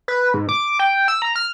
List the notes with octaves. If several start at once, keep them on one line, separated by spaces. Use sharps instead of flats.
B4
G#2
D6
G5
E6
A#5
F6